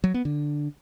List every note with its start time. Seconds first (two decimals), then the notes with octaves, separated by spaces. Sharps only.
0.04 F#3
0.14 B3
0.25 D3